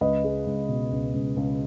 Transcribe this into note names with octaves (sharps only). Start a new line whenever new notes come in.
C#2 B4 D#5
G#3
C#2
B2
C#2
C#2
C#2